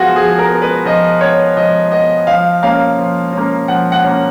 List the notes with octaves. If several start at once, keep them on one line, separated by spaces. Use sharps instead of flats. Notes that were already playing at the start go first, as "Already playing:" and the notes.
Already playing: F3 B3 F4 F#4 G#4
F3 G#4
A#4
B3
B4
F3 D#5
B3 C#5
F3 D#5
B3 D#5
F3 F5
A#3 C#4 F5
F3
A#3 C#4
F3 F#5
F#5
A#3 C#4